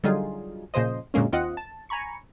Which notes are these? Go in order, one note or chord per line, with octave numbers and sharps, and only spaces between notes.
D3 F#3 G3 D#4 F4 G#4
A#2 C#3 F3 C5 D#5
F#2 A#2 D3 G#3 A#3 C#4
D#2 C4 F4 D#5 F#5
A5
G#5 A#5 B5 C#6 C#7